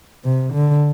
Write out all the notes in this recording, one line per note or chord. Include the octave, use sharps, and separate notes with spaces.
C3
D3